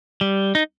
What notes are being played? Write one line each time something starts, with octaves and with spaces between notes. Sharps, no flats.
G3
D#4